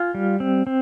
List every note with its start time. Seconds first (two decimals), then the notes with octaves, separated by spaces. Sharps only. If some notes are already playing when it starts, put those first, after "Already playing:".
Already playing: F4 F5 G#5
0.15 G3
0.40 C4
0.67 C4